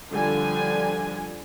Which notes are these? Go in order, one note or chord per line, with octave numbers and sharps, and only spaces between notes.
D3 F3 G3 G#5